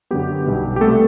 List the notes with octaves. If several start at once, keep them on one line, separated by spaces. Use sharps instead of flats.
F#2 D3 F#3 B3 G4
B1 B2 G3 B3
G4
C3 G3 A3 B3 A4